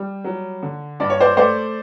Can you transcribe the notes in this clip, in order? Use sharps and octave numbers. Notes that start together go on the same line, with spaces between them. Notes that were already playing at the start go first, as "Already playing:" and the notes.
Already playing: G3
F#3
D3
G2 D5
C#5
C5 D5
A3 C5 D5